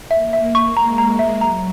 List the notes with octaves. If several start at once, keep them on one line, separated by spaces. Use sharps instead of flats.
A#3 E5
E5
C#6
G#3 A#5
A#5
E5
F#3 A#5